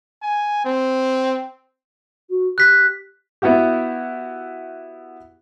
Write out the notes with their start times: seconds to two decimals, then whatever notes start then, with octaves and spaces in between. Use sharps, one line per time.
0.23 G#5
0.65 C4
2.30 F#4
2.58 G4 F#6 B6
3.42 B3 E4 F#4 G4